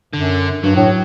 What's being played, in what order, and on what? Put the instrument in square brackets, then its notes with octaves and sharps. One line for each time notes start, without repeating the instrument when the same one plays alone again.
[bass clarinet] F#2 [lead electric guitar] D3
[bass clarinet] G2 [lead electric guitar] F#3
[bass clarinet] A2